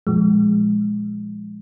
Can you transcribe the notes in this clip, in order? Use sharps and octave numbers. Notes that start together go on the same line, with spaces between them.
A#2 F3 G#3